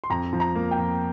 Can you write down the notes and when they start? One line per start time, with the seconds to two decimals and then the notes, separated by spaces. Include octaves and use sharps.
0.04 C6
0.10 F2 A#5
0.33 F3
0.40 A#5
0.55 A#3
0.71 G5
0.78 F2